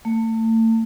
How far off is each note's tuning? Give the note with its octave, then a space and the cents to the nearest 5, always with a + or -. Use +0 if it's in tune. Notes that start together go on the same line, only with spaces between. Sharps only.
A3 +35